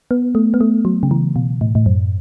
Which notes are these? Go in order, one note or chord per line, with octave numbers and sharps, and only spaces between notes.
B3
A3
B3
A3
F#3
C#3
E3
B2
A2
A2
F#2